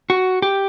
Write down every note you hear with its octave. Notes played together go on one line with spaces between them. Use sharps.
F#4
G4